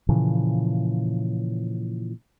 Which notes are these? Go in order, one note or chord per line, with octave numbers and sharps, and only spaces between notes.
A#2 C#3 E3 F3